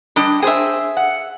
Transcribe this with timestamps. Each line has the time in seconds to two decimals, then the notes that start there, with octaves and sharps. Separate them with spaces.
0.16 G3 D4 D#5
0.42 G#4 C5 E5 G5
0.97 F#5